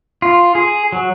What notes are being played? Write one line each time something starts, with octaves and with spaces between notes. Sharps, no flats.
F4
G#4
F#3